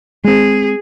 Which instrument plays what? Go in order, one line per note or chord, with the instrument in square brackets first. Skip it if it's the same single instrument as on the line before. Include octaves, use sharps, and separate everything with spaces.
[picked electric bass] G#3 C4 [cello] G#4